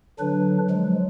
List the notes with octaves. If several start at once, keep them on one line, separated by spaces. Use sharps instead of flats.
D3 F#3 D4 B4
F3 F#3 G#3